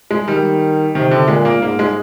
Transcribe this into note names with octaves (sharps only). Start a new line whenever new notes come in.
G#3
D#3 G3
C3 D#3
D3
A#2 G#3
A#3
G#2 A#3
G#3